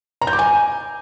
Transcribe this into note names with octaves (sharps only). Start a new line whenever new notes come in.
A#5
G6
D6
G#5